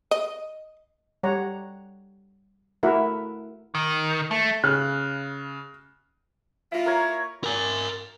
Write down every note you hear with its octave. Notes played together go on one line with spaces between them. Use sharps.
D#5
G3 C#5 F#5 A#5
A3 E4 F#4 A#4 E5 F#5
D#3
A3
C#3 F6 F#6
A#3 E4 F4
A#4 C#5
A#4 G#5